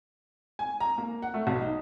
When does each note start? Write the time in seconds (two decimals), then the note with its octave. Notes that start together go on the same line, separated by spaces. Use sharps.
0.59 G#5
0.80 A#5
0.98 A#3
1.22 F#5
1.34 A3
1.47 B1
1.61 D#4